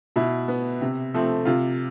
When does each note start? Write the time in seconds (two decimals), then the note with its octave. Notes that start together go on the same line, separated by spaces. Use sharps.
0.16 B2 E4
0.48 B3
0.81 C3
1.14 F3 A3 C4
1.45 C3 F4